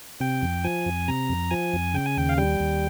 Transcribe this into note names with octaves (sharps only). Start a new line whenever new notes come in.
C3 G5
F2
F3 G#5
F2
C3 A#5
F2
F3 G#5
F2
C#3 G5
G#5
D#2 G5
F5
G3 G5
D#2